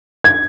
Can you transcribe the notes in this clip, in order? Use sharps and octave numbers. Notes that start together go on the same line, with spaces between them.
G#6